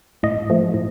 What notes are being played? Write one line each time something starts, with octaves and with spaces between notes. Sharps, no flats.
A2 D#5
F3 A3
A2